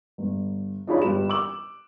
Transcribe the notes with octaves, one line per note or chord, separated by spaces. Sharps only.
G1
D4 D#4 F4 G#4 C#5 B5
G1 G3 B4 E7
D6 E6 F#7